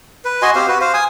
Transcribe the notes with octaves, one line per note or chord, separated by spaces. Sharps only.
B4
F#4 D#5 G#5 C6
C4 G4 C5 F5
F#4 B4
C5 F5
G#5 D#6